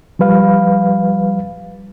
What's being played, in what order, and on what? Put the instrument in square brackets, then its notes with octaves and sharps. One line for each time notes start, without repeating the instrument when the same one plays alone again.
[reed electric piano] F3 G3 B4 F5